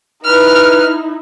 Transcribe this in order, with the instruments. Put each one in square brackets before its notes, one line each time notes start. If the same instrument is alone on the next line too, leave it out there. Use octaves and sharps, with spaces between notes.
[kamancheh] D#4 E4 [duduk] B4 [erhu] F6